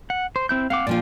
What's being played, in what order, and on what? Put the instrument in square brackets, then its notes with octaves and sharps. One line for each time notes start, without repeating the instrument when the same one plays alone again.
[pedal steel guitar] F#5
C5
C4 E4 G6
[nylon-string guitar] C4 [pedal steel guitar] F5 F#5 D6
[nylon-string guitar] A#2 F3 F4 [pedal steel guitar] D5 G5